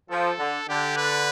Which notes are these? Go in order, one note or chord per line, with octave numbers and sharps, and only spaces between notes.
F3 A4
D3
D3 G4
B4